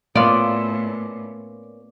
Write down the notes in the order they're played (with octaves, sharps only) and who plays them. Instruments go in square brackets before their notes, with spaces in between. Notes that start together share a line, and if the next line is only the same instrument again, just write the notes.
[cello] A2 [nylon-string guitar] A#3 C#4 [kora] B3 F4 [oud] D5